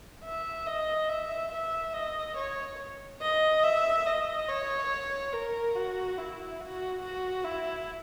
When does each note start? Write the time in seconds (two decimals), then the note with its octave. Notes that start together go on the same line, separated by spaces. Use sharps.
0.25 E5
0.67 D#5
1.09 E5
1.52 E5
1.94 D#5
2.37 C#5
3.22 D#5
3.64 E5
4.06 D#5
4.49 C#5
5.33 A#4
5.75 F#4
6.18 E4
6.60 F#4
7.02 F#4
7.44 E4